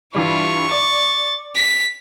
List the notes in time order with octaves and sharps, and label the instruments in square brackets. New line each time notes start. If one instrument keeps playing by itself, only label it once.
[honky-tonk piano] G2 E3 G3 [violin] E4 F4 [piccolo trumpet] C#6
[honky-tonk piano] D5 [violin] A6
[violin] B6